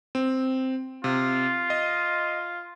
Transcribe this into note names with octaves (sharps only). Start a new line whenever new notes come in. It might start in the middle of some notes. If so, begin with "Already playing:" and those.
C4
C3 F4
D#5